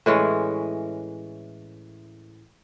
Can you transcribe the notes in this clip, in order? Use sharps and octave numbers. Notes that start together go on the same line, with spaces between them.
A2 E3 G#3 C#4